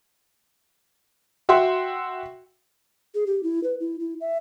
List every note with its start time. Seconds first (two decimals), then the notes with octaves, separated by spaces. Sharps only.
1.49 F#4 E5 F#5 G5 C6 E6
3.14 G#4
3.27 G4
3.43 E4
3.64 B4
3.80 E4
4.00 E4
4.21 E5